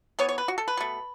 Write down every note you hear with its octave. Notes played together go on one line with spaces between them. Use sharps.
E3 B3 C#5
C#5
B4
F#4
A4
B4
B2 A3